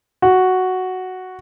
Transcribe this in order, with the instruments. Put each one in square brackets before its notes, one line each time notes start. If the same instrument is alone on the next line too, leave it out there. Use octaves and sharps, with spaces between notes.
[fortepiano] F#4